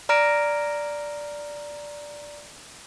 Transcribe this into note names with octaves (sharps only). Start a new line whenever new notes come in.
D5 A#5 F6 A#6 D7